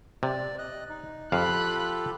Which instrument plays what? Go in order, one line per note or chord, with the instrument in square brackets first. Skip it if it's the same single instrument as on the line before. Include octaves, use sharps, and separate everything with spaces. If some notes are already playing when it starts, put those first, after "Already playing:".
[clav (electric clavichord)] C3 [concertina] D5
[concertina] D#5 F#6
D#4
[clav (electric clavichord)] F2 F5 [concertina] F4 G4 A4 [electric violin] B5 F#6